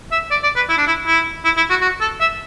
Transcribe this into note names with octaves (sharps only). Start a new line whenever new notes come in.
E5
D5
D5
B4
E4
D4
E4
E4
E4
E4
F#4
F#4
A4
E5